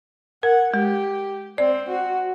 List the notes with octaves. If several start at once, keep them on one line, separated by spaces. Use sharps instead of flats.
A#4 F#5
G#3 G4
C4 D5
F#4